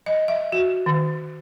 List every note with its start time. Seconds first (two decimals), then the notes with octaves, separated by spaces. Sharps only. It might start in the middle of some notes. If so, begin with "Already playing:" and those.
0.06 D#5
0.28 E5
0.52 F#4
0.86 D#3